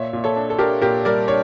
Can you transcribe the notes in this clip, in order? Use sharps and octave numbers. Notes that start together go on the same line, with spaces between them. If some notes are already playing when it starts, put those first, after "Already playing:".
Already playing: A#2 C#5 E5
A#2
A4 C#5
D4
A4
D4 G4 A#4
A#2 G4 A#4
G3 A#4 D5
D4 C#5